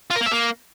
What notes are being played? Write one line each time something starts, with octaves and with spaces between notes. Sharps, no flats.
F4
A#4
A#3
E5
A#3